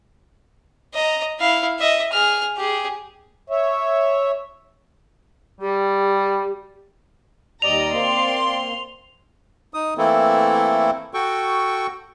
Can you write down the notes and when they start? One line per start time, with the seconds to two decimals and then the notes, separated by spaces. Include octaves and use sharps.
0.94 D#5 A#5
1.39 E4 F5
1.79 D#5 E5
2.12 G#4 F6
2.57 G4 G#4
3.50 C#5 E5
5.61 G3 G4
7.62 D#2 G3 D5 D#5 A#5 F7
7.93 A#3 C4 C6
9.74 D#4 D#6
9.98 E3 A3 A#3 C4 E4 A4
11.14 F#4 A4 G5 C#6